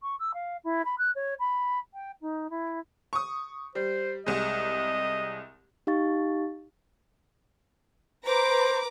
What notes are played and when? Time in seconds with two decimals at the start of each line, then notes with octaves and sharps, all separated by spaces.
0.03 C#6
0.20 E6
0.34 F5
0.64 E4
0.85 B5
0.99 F#6
1.15 C#5
1.40 B5
1.94 G5
2.21 D#4
2.50 E4
3.13 C#6 D#6
3.75 G3 C5
4.26 C2 G#3 D#5
5.87 D#4 G4 F5 C#6 A6
8.26 B4 C5 A#5 D6